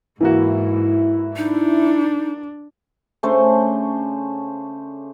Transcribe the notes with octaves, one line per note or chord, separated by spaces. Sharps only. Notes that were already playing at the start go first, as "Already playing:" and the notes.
G#2 E3 A#3 E4 F#4
D4 D#4
C#3 A3 D4 C5